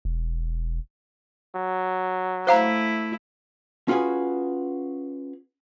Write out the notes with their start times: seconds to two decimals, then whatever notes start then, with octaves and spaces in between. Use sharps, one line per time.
0.05 E1
1.56 F#3
2.47 A3 E4 C5 F5 A#5
3.88 C#4 F4 F#4 G#4 B4 G#5